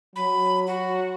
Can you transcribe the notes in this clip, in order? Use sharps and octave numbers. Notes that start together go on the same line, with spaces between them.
F#3 B5
F#4